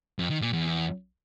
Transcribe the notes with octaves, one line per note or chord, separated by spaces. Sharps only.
F2
D#3
A#2
E2